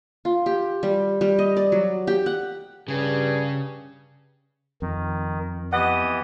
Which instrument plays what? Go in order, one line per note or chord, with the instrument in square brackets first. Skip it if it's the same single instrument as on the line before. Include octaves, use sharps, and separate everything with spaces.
[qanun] F4
G4
G3
G3
D#5
D5
F#3
G4
F#5
[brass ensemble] G2 [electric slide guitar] C#3 [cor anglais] G#4
[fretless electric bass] F2 [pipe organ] D#3
[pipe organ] E3 B3 G4 [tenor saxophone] D#5 [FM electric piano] F#5